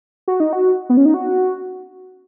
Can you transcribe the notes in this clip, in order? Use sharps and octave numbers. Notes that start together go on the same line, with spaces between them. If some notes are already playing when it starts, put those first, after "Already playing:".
F#4
D#4
F#4
B3
C#4
D#4
F#4